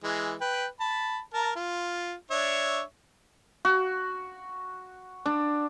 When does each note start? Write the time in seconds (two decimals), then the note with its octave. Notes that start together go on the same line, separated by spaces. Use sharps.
0.04 E3 G#3
0.41 B4 G5
0.80 A5 B5
1.33 A#4 A5 A#5
1.56 F4
2.31 D4 C#5 E5
3.65 F#4
5.26 D4